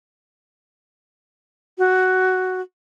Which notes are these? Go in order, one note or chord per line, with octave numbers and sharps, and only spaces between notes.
F#4